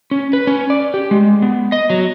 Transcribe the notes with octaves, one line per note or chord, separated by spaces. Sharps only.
C#4
B4
C#4
D5
G4
G#3
B3
D#5
F#3